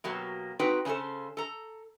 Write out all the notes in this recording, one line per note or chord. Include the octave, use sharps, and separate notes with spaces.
B2 F#3 A#3 G4
C4 D#4 F#4 B4 G5
C#3 C#4 F4 A4 C5
A4 A#5